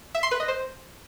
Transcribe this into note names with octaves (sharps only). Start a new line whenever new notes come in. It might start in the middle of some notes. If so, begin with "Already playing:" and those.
E5
C6
B4
D#5
C5